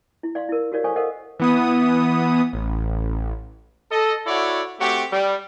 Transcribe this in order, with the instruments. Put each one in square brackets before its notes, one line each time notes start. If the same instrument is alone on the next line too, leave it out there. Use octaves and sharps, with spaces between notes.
[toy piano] E4
D5 F5 C6
E4 A#4
F#4 G4 A#4 C#5 D5 F5
A4 C5 C#5 F5 G#5 C#6
A4 A#4 C5 D#5 F5 F#5
[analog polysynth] E3 B3 D#6
A1
[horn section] A4 D#5
E4 F#4 A4 C#5 D5
A3 C4 F#4 G4
G3